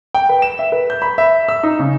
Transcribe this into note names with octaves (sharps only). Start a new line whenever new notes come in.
G5
B4
E7
E5
B4
G6
B5
E5
E6
D#4
C#3